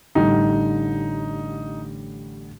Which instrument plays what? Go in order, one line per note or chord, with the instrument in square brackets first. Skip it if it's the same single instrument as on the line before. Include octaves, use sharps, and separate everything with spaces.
[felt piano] A1 D3 G3 [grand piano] D#4